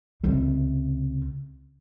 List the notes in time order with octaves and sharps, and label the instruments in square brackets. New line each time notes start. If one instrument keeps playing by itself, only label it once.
[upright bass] C#2 C3